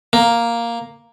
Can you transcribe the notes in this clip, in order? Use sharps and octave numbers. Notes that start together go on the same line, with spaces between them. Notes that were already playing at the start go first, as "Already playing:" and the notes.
A#3